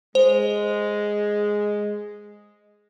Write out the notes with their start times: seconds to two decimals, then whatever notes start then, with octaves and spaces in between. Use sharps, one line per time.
0.15 G#3 C5